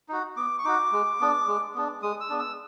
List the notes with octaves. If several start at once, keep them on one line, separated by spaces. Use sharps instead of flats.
D#4 F#4
B3 D6
C#6
D#4 F#4 D6
G#3
B3 D4
G#3
B3 D4
G#3 D#6
E6
B3 D4
E6